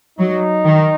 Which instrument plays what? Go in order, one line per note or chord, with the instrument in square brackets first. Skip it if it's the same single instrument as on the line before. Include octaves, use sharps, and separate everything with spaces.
[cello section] F#3 [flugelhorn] D#4
[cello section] D#3